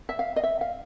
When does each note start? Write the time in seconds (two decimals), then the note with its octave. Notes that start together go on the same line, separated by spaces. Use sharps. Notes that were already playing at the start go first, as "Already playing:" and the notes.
0.09 E5
0.19 F5
0.36 D#5
0.43 E5
0.61 F5